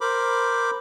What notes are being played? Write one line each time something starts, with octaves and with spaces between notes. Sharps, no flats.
A#4 C5 B5 D6